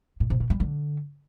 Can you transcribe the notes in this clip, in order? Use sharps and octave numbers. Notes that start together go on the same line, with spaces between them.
A2
C3
B2
G3
D3